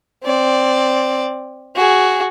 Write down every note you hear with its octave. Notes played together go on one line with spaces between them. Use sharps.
C4 D5
F#4 G#4